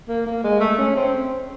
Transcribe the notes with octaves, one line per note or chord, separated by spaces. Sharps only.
A#3
A#3
G#3
A3
C#4
C4